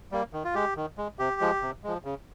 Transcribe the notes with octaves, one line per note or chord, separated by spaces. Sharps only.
G3 A#3
D#3
F4
G#3 G4
D#3
G#3
C3 G4
F3 G#3
C3
F3 G#3
C#3